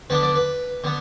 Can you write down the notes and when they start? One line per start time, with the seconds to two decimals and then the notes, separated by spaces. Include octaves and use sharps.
0.10 D3 B3 D4 B4
0.23 D5
0.36 B4
0.84 D3 B3